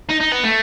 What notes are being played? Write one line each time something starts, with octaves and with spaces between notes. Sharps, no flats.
D#4
D#4
B3
A3